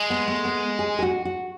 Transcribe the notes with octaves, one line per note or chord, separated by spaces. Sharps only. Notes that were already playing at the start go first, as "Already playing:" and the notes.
Already playing: G#3
B3
A3
B3
G#4
G#4
F#4
F#4